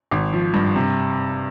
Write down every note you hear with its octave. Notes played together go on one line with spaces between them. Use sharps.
G#1
F3
G2
C3